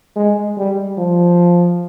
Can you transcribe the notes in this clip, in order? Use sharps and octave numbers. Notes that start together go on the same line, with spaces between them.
G#3
G3
F3